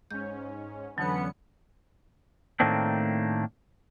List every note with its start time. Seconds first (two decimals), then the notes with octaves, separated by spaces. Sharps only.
0.11 G#2 C#4 G6
0.98 F2 D3 E3 F#3 B3 C#4 C#7
2.60 A2 D#3 A3 A#3 C4 D4